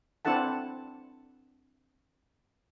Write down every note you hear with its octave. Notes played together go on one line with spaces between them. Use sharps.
C4 D4 E4 A4 F#5 A5